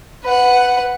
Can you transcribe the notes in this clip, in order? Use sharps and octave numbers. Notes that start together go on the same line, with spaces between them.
B4 F#5